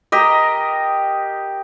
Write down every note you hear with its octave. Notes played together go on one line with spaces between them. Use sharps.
G4 A#4 D#5